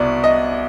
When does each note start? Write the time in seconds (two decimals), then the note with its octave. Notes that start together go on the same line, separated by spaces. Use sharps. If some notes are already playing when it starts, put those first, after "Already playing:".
Already playing: C2 B2 D5
0.24 D#5